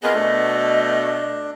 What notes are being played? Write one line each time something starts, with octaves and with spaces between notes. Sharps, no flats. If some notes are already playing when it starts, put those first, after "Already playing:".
C3 A#3 B3 F4 G#4 B4 D#5
B2 A3 D4